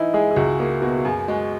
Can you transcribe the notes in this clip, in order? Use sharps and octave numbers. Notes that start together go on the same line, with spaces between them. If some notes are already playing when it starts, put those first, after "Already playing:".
Already playing: E3 D#4 E4
G#3 G#4
G#4
C#2 F#4
A#3 G#4
B2 F#4
F#4
F#2 G#4
G#3 F#4